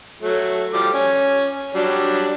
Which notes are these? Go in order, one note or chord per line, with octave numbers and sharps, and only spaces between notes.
F#3 A3
F3 G3 D6
C#4
F#3 G3 D4